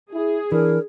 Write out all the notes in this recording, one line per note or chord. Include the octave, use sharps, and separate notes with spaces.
E4 G#4
E3 D4 A#4